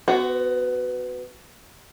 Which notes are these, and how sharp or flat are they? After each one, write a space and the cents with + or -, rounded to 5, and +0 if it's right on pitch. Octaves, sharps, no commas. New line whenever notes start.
B3 +15 F#4 +5 C5 -20